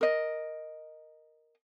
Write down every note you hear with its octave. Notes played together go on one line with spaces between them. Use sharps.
A#4 D#5